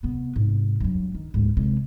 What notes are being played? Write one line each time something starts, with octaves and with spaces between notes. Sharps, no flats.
C3 B3
G#2 C3
G2 F#3
D#3
D2 G#2
C3 G#3